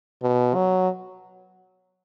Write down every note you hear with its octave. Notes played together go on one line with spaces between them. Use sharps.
B2
F#3